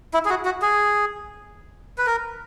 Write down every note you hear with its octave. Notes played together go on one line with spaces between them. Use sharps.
E4
G#4
F#4
F#4
G#4
B4
A#4